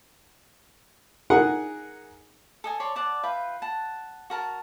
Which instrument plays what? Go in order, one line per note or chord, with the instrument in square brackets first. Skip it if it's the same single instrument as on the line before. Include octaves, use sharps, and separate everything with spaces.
[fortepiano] D#4 G#4 A#4 F#5 G#5
[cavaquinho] A4 D#5 G#5
C#5 D5 A5 C6
D5 F#5 A5
F4 B4 E5 G5
F#5 A5
F#4 A#4 A5